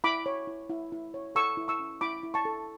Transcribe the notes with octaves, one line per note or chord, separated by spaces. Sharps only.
E4 B5 D6
C#5
E4
E4
E4
C#5
A4 C#6 E6
E4
C#6 E6
C#4
E4 B5 D6
E4
A5 C#6
A4